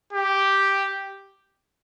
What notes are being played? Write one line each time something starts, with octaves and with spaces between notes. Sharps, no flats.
G4